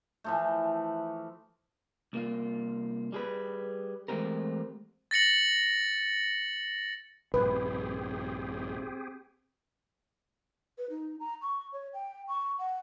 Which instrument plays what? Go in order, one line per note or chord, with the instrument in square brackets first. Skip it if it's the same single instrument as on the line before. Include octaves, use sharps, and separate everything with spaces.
[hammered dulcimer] E3 F3 A3
[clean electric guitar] C2 A#3 F4
G3 G#4 B4
E3 G#3 A3 C4 G4 A#4
[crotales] A6 A#6 C#7 F#7
[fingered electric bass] A#1 G2 [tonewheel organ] C4 G4 G#4 [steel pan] B4
[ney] B4
D#4
A#5
C#6
C#5
G5
C#6
F#5